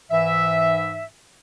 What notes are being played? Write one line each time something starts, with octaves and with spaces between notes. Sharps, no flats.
G#2 E3 E5